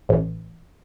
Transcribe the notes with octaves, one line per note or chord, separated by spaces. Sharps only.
A1